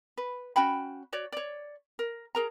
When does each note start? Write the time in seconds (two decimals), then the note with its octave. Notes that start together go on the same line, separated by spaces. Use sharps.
0.17 B4
0.56 C#4 F#4 G5 B5
1.13 F#4 C#5 D5
1.32 C#5 D5
1.99 A#4
2.35 G#4 A#4 A#5